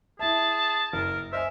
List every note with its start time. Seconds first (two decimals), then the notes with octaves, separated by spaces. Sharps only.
0.19 E4 G#4 E5 A5
0.93 F#1 A#4
1.33 C5 D#5 E5 G#5 F6